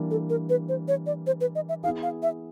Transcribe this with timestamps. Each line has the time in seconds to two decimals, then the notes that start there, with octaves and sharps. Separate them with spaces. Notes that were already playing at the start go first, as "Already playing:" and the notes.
Already playing: E3 G3 A#3 D4
0.11 A4
0.30 A#4
0.49 B4
0.69 C5
0.88 C#5
1.06 D5
1.27 C5
1.41 B4
1.55 D#5
1.69 E5
1.83 B3 E4 G#4 F5
2.03 F5
2.23 E5